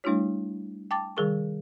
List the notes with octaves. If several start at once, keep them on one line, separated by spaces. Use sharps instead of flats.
G3 A3 D4 E4 F#4 C#5
G5 A5 D6 A6
C3 D#3 G3 G#4 A#4 C#6